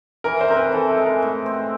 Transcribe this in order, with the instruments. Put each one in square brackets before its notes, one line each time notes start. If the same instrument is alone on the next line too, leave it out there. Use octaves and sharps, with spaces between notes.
[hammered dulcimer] E3 [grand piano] A#4
[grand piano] C5
[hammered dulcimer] C4 [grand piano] A#4
[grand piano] B4
[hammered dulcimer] E3 [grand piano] A4
[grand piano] A4
[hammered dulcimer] G#3
[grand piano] A#4
[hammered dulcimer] A2
C4